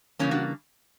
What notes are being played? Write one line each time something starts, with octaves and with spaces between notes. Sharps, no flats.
C#3 E3 G3 A#3 C#4
D4 F#4